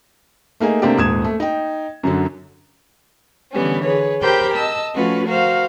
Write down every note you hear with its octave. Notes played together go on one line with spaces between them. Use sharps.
A3 A#3 D#4 G#4
C3 A3 A#3 C4 D4 G4
D#1 G#2 D#6 G#6 E7
A3
D#4 G5
F#2 D3 F#3
D3 E3 G3 B3 C#4
G#4 B4 C#5
G4 A#4 C5 G5 B5 G6
D#5 A5 E6
F3 A3 C#4 F4 F#4 B4
F#4 A#4 C5 F5